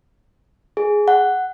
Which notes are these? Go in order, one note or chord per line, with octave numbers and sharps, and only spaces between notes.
G#4
F#5